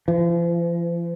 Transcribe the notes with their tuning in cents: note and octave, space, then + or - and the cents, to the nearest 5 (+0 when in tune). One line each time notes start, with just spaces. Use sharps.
F3 -40